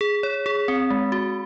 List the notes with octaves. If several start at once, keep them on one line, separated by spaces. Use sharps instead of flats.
G#4
C#5
G#4
C4
G#3
F#4